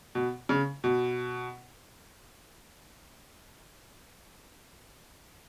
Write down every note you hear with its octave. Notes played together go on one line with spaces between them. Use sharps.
B2
C#3
B2